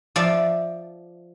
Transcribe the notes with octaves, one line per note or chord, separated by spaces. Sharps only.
F3 D5 E5